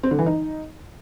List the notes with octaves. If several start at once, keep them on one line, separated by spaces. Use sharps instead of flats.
C4
D3
E3
D#4